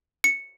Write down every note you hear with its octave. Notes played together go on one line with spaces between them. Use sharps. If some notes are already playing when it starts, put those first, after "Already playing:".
C#7